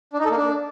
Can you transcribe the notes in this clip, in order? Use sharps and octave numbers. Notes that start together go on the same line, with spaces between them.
D4
D#4
A4
A#3
D4